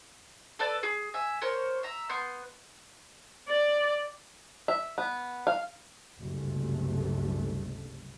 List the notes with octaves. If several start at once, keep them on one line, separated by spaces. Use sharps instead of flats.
A4 B4 D5
G#4
E5 G#5
A#4 C5 C#5
E5 A#5
B3 C6 G6
D5
E5
B3
F5
F#1 C#2 G2 C3 G#3 A3